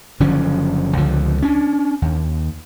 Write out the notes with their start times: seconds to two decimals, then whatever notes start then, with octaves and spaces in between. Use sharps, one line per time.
0.20 F#1 D3 F3 C#4
0.97 C#2 D3 F3
1.42 C#4 D4
2.02 D#2